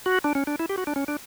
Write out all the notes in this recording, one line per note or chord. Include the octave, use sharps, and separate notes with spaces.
F#4
D4
C#4
D4
E4
G4
F#4
D4
C#4
D4